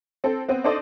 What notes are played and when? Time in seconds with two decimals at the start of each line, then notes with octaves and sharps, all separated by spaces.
0.24 C4 A4
0.49 B3 C4
0.64 D4 D#4 A4 C5 D5 D#5